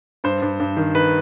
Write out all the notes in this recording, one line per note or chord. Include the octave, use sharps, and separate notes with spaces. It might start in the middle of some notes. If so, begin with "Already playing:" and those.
G2 C5
G2
G2
D#3
D#3 B4